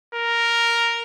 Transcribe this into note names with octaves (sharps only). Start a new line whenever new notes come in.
A#4